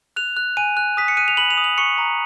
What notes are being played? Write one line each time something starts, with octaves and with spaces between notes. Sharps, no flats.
F#6 F7
F#6
G#5 D#7
F#6
D#6 B6
C#7
F#6 D#7
F7
B5 F#7
F7
D#6
F#7
C#6 C#7
A#5